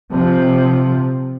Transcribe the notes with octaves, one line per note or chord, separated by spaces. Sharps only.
C3 F3